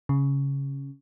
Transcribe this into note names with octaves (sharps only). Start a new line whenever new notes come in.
C#3